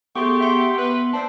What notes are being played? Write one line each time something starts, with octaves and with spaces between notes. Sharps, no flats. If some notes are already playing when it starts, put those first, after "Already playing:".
A3 B3 G4 G#4 C6 C#6
E5 C6 C#7
B4
C4 D4 A5